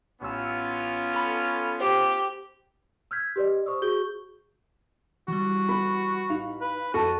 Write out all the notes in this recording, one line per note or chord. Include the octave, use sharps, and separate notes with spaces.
A1 B3 C#4 F4 E6
A4 B5
G4 C5
E6 F6 G6 G#6 B6
G4 B4 D5 D#5
C5 C#6 D#6 E6
F#4 G#4 C#6 G6 G7
E3 G3 F#4
B4
A1 D#4 F5
B4
F2 F#4 A4 F6 D#7